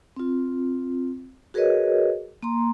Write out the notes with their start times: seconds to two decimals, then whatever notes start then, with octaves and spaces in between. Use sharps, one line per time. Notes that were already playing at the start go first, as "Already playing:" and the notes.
0.16 C4 F4
1.54 F#4 G#4 A#4 B4 C#5 D#5
2.43 A#3 A#5 C6